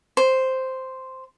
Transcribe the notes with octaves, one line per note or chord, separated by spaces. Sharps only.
C5